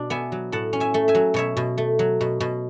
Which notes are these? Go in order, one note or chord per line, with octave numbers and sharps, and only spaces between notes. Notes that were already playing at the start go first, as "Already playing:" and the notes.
Already playing: B2 D4
B3 E5 G#5
F#3
A2 F#5 A5
C#4
E5 G#5
A3
E5 G#5
F#3
B2 C#5 E5
B2
A3
F#3
B2
B2